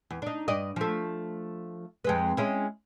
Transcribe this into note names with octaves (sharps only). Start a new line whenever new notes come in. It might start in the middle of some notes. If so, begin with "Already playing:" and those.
E2
D4 D#4
G2 D5 D#5
F3 A3
F2 G#3 B4
G#3 C#4 E4